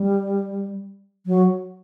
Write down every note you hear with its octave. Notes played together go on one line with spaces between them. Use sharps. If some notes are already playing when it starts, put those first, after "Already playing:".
Already playing: G3
F#3